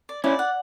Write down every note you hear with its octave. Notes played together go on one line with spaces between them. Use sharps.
D5
C#4 E4 D5
F#5